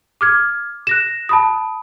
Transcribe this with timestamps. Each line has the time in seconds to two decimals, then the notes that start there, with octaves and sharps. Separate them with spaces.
0.21 D6 F6 G#6
0.87 F#6 A#6 E7
1.29 A5 B5 D#6